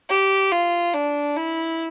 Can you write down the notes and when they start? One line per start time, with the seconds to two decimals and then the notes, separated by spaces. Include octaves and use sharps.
0.09 G4
0.51 F4
0.94 D4
1.36 E4